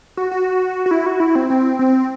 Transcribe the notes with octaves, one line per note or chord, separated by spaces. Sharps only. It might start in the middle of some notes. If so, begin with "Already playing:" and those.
F#4
F#4
F#4
E4
F#4
E4
C4
C4
C4